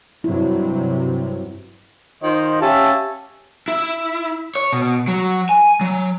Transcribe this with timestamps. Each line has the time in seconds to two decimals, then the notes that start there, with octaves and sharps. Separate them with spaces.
0.24 G2 C3 F#3 E4
2.23 D#3 F4 C5 D#5
2.61 C#4 G4 E5 F5 A5
3.68 E4
4.55 C#5
4.73 B2
5.08 F#3
5.49 G#5
5.81 F#3